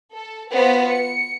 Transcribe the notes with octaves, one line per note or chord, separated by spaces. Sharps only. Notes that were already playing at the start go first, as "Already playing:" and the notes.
A4
B3 F4 F#4 B4 C5
C#7